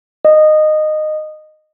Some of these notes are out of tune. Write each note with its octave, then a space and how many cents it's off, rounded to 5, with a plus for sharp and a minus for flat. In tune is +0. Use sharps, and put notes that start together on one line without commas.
D#5 -15